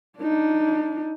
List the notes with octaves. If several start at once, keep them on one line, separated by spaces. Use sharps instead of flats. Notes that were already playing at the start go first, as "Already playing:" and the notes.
D4 D#4